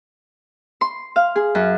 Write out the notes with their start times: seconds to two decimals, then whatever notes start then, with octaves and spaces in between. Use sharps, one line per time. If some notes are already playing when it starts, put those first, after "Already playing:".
0.81 C6
1.16 F5
1.36 G#4
1.55 F#2